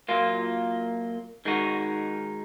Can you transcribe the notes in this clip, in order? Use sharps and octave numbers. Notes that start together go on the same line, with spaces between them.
A#2 F#3 A#3 F4
D#3 G#3 D#4 F#4